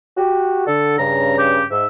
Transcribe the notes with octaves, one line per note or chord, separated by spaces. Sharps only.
F#4 G4
D3 A4
G2 C#3 A#5
G4
G#2 E5